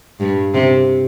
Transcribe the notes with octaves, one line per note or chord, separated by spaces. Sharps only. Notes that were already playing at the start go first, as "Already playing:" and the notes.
G2
C3